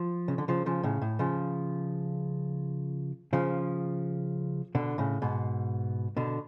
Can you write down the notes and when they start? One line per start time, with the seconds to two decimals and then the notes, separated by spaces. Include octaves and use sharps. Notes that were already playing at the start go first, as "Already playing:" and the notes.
Already playing: F3
0.28 C#3
0.38 D3
0.48 C#3 F3
0.66 C#3 F3
0.83 A2 C#3
1.02 A2
1.19 C#3 F3
3.33 C#3 F3
4.75 B2 D3
4.98 A2 C#3
5.22 G#2 B2
6.17 B2 D3